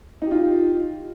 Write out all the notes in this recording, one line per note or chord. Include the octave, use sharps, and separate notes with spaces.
D#4 F4 G4